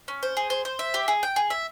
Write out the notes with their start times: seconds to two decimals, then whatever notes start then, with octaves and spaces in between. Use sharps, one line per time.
0.08 C#4
0.23 C5
0.37 G#4
0.50 C5
0.65 C5
0.79 E5
0.94 G4
1.08 G#4
1.23 G5
1.36 G#4
1.50 E5